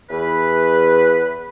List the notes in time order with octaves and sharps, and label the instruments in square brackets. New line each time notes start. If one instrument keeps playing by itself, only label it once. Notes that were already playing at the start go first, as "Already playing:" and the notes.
[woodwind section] E2 B4